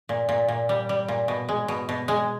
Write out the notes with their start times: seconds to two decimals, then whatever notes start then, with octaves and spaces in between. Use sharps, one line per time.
0.09 A#2
0.29 A#2
0.48 A#2
0.69 G3
0.89 G3
1.08 A#2
1.28 B2
1.49 G#3
1.68 B2
1.89 B2
2.08 G#3